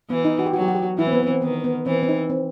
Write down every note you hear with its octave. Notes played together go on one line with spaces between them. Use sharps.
E3 B3
D#4
F#4
G4
F#3 F#4
G4
F#4
G4
F#4
E3 E4
C4
B3
B3
C4
D#3 B3
B3
E3 C4
C4
D#4
C4